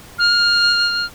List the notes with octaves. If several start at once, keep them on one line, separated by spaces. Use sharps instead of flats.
F6